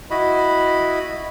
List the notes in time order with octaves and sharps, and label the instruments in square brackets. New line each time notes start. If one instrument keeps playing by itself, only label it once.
[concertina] E4 F#4 D#5 B5